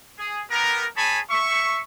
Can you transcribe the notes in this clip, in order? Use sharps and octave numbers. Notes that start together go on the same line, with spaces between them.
G#4
B3 G4 A#4
G#4 C#5 G#5 A5 B5
E5 C#6